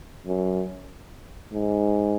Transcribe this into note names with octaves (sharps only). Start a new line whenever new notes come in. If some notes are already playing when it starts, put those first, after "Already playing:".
F#2
G#2